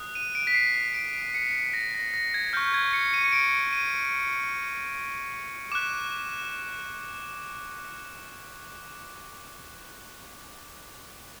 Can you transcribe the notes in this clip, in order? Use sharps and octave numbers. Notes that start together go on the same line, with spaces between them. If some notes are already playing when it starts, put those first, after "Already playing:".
Already playing: D#6 F#6
D#7
D7
B6
C7
C7
D7
C#7
A#6
A#6
A#6
G#6
C#6 F6 G6
G#6
C#7
D#7
C#7
D7
D#7
D6 F#6 E7